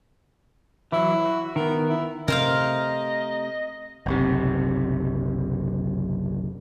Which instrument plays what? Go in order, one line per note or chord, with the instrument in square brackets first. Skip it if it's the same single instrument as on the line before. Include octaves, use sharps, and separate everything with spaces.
[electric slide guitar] E3 F#3 [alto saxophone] E4
[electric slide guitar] F#4
[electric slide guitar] D#3 B3 [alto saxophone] A#4
[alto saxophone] E4
[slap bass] C3 A3 [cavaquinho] A#4 C5 F5 [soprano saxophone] D#5
[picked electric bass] F#1 B1 C3